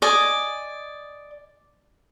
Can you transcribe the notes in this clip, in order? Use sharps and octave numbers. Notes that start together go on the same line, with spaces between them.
D5 D#5 G#5